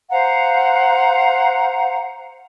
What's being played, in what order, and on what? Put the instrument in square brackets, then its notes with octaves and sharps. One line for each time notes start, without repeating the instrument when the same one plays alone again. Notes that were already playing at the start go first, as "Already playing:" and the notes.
[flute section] C5 F5 F#5 A#5